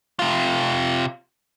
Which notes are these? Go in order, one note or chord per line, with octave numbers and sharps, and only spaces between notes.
C3 F4